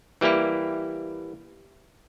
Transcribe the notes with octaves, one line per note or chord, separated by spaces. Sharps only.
E3 G3 A#3 E4 G4